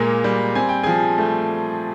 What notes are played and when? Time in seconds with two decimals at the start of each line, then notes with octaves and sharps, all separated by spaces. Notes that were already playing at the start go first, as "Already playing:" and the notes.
Already playing: A#2 G#3 A#3
0.24 G3
0.55 C4 G#5
0.69 G5
0.83 F3 G#4 G#5
1.18 A3